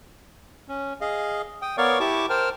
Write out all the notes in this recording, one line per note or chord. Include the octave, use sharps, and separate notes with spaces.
C#4
G#4 D#5 F5
G5 D#6
B3 A#4 C#5 D5 F5 C#6
E4 G4 A5 C#6 D6
A#4 C5 G5 A5 F6